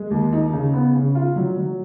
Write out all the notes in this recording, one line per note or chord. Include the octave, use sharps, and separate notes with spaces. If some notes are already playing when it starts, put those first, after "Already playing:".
Already playing: G#3
D#2
D#4
C#3
B3
C#3
F4
F#3
F#3